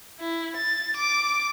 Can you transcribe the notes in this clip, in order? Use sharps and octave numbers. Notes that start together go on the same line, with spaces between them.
E4
A6
D6